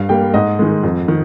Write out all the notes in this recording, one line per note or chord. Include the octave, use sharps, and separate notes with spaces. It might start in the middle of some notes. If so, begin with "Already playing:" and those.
Already playing: G2 F5
G3 A#3 G5
G#2 D#5
D#3 G#3
F2
D#3